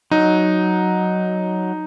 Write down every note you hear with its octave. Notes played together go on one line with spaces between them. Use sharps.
F#3 D#4